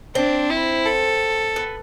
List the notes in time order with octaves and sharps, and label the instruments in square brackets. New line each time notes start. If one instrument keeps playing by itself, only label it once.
[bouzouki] C4 [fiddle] D4
[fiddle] E4
A4
[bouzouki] B3